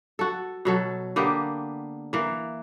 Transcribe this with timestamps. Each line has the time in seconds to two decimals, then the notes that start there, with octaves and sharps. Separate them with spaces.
0.19 F#4 A4
0.65 B2 F#3 A4
1.16 D3 A#3 B3 G4
2.13 E3 A#3